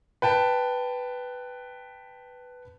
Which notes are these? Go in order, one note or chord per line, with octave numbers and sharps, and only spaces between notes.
B4 G5 A5